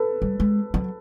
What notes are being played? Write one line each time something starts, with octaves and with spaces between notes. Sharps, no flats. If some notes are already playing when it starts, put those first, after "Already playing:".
Already playing: A4 B4
G3
G#3
F#3